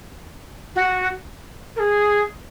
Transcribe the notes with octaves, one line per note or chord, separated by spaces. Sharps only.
F#4
A#4
G#4